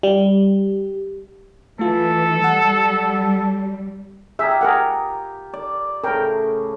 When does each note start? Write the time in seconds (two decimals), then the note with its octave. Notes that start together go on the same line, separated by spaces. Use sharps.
0.03 G3
1.79 E3 A3 F4 A4
2.44 G3 F#5
4.39 F4 G4 G#4 E5 A#5
4.61 G#4 A#4 F#5
5.54 D5
6.04 A2 C#3 A#4 G5